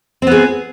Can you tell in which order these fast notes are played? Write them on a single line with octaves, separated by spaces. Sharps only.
C4 B3 G#4